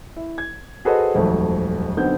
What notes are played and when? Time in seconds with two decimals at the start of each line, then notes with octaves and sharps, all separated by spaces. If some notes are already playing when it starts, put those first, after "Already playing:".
0.16 E4
0.38 G#6
0.85 F#4 G#4 A4 B4 C5 D#5
1.14 D#1 G#1 F2 F#3 A3 F#4
1.97 B1 D3 B3 C4 G6